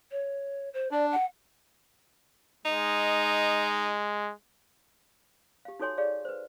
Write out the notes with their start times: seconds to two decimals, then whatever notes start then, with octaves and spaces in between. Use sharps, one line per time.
0.11 C#5
0.73 C5
0.91 D4 D5
1.12 F#5
2.65 G#3 D#4
5.65 G4 F5
5.80 D#4 F#4 A4 C#5 G#5 C6
5.97 G4 G#4 C#5 D5 F5
6.25 B4 C5